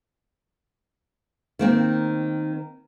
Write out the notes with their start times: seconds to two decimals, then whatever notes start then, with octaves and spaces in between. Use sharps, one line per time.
1.59 D#3 A#3 C4